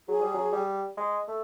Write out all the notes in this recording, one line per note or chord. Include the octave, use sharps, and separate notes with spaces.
F#3 G#4
G3
F#3
G3
G#3
A3